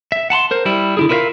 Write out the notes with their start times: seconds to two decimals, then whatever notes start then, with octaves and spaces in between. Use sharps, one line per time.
0.12 E5
0.30 F#5 A5 B5 C6
0.51 A#4 C5
0.66 G3 E4
0.97 D3 E4 G#4
1.09 E4 F4 A#4 B4 E5 F5